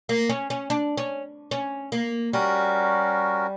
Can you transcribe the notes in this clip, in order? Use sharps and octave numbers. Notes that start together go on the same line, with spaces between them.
A#3
C#4
C#4
D4
C#4
C#4
A#3
G3 C#4 F#4 A#4